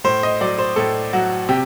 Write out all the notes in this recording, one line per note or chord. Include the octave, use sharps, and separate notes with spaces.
A2 C5
D#5
F#3 D5
C5
A2 A4
F#3 F#4
C3 G4